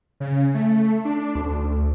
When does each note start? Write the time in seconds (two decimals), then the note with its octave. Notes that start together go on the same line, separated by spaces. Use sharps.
0.20 C#3
0.54 A3
1.05 D4
1.35 D2